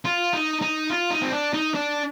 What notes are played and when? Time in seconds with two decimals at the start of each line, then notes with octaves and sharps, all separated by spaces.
0.05 F4
0.33 D#4
0.61 D#4
0.90 F4
1.11 D#4
1.22 C4
1.32 D4
1.54 D#4
1.74 D4